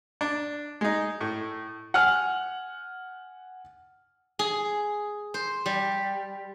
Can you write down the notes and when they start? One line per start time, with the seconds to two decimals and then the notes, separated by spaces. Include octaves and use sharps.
0.21 D4
0.81 G#3 D#4
1.21 A2
1.94 F#5 G#5 F6
4.39 G#4
5.34 C5
5.66 G3